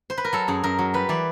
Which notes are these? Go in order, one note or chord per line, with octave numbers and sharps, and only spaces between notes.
C5
B4
A#4
F#3 A4
F#2 G#4
F#2 A#4
F#3
G3 B4
E3 D5